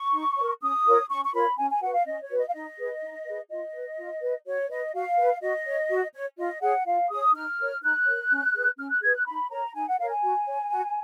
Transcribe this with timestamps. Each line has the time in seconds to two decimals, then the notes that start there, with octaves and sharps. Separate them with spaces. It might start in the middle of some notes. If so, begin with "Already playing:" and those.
Already playing: C#6
0.14 D#4
0.37 C#5
0.42 A#4
0.62 C#4 D#6
0.86 F4 A#4 C#5
1.09 C#4 C#6
1.25 C#6
1.33 F4 A#4 C#5 B5
1.57 C#4 G#5
1.70 G#5
1.82 F#4 B4 F#5
1.93 F5
2.05 C#4 D#5
2.22 C#5
2.30 F#4 B4
2.38 D#5
2.48 F5
2.54 D#4 D#5
2.78 G#4 B4
3.02 D#4
3.26 G#4 B4
3.49 F4 D#5
3.74 B4
3.98 F4
4.21 B4
4.46 F#4 C#5
4.70 B4 D#5
4.94 F#4 F5
5.18 B4
5.42 F#4 D#5
5.65 C#5
5.90 F#4
6.14 C#5
6.38 F4 D#5
6.62 G#4 C#5 F#5
6.86 F4 F5
7.10 G#4 C#5 D#6
7.34 D#4 F6
7.58 A#4 C#5
7.82 D#4 F#6
8.06 A#4 C#5
8.30 C#4
8.55 G#4 B4
8.78 C#4 F6
8.90 F#6
9.02 G#4 B4 G#6
9.15 F#6
9.26 D#4 B5
9.50 A#4 C#5 A#5
9.74 D#4 G#5
9.87 F#5
9.98 A#4 C#5 F5
10.10 G#5
10.22 F#4
10.47 C#5
10.70 F#4